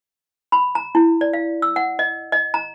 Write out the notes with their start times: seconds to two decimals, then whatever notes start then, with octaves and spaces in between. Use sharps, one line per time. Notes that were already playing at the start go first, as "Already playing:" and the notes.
0.52 B5
0.75 A#5
0.95 E4
1.21 D5
1.33 F5
1.62 E6
1.76 F#5
1.99 D#5
2.32 D#5
2.54 A#5